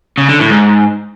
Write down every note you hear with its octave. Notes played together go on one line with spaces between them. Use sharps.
C#3
D3
A2
G#2